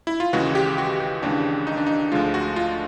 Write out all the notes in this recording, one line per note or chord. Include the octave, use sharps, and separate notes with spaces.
E4
F4
D#2 C#3 E3 G#3 F#4
G4
F#4
G4
D#2 C#3 E3 G#3 D4
D#4
D4
D#4
D2 D3 F3 G#3 F4
F#4
F4